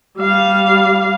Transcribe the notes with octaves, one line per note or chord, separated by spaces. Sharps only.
G3 F5